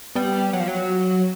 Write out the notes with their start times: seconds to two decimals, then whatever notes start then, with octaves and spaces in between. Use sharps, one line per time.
0.15 G3 B3
0.53 F#3
0.60 F3
0.68 F#3